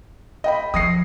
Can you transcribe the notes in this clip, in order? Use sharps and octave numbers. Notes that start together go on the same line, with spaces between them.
D#5 G5 B5
F3 D#6 A#6 C7